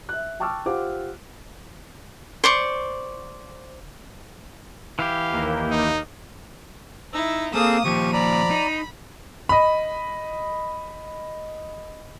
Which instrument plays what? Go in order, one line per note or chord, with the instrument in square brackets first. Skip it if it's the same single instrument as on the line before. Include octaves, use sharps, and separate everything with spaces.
[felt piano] E5 F#6
G5 A5 C#6 D6 E6 F6
F4 G4 C5 F5 F#5 D6
[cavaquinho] C5 D5 C#6
[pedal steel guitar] E3 E4 G4 [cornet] F5
[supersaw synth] D#2 A#3
[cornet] D#4
[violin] D#4 E4 [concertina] E6
[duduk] A#3 [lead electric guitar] C4 [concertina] G#4 A4 F5 [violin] D#6 E7
[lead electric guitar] D#2 A#2 [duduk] F3 [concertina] G4 C#6 [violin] D#7
[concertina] D5 A#5 [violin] B5
[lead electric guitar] D#4
[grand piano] D#5 B5